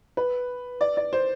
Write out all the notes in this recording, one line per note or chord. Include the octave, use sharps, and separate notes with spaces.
B4
D5
D5
C5